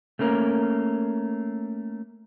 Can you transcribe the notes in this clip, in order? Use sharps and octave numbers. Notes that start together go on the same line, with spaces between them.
A3 A#3 C#4 A#4